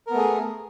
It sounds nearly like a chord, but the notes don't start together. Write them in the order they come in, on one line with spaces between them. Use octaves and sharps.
A#4 B3 A3 G#4